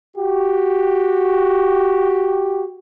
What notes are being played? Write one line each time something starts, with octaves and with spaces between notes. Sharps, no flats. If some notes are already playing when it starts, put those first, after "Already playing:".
F#4 G4